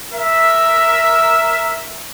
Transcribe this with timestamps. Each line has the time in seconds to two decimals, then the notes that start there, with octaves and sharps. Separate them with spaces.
0.12 A#4 E5